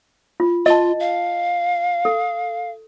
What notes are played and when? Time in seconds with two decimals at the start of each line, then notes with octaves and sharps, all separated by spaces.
0.40 F4
0.66 F4 D#5 A5
1.00 F5
2.05 A4